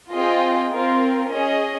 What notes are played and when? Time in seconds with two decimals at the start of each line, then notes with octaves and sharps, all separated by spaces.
0.12 C4 F4 G#4 D#5 G5
0.71 C4 F4 A#4
1.29 C#4 G#4 D#5